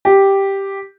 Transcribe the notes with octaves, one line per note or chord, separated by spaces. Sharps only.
G4